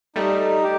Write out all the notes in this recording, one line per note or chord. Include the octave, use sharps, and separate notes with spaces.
G3 A3 D#4
G4